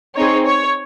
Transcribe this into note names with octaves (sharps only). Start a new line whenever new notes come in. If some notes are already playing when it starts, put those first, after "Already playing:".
C4 D#4 G#4 C#5
C#5